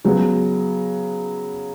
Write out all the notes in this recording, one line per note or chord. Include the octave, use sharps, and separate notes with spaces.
C#3 F#3 B3